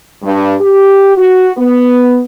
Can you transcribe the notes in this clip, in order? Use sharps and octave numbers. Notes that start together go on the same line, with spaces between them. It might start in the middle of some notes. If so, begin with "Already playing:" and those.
G2
G4
F#4
B3